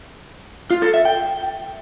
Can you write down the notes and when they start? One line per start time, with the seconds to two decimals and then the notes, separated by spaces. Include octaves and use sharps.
0.70 F4
0.82 A4
0.94 E5
1.05 G5